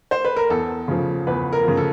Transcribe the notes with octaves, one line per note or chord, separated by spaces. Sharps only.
C5
B4
A#4
E2 A4
C#3 F3
E2 B4
A#4
C#3 F3
A4